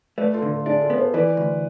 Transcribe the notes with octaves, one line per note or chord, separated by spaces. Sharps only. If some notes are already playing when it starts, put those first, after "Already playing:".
A3 B4 D5
F4 A4
D3
F4 A4
D4 E4 G#4
F4 A4
B3
A4 C5
E3 B4 D5
D2